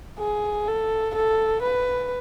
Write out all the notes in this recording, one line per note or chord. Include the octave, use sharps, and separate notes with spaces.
G#4
A4
A4
B4